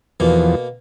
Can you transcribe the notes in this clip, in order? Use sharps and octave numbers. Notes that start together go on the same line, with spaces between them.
E2 B2 F3 A#3